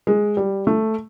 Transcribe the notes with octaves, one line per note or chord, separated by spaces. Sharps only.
G#3
G3
A3